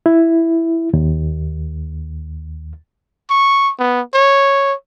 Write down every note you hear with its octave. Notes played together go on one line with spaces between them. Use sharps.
E4
D#2
C#6
B3
C#5